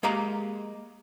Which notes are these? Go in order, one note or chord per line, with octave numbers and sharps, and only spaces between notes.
G#3 A#3 G4 F5 A#5